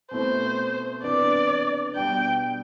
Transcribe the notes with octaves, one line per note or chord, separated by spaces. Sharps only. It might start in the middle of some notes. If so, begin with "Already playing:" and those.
B2 A3 C4 E4 C5
C3 E3 B3 D4 D5
B2 G3 D4 G5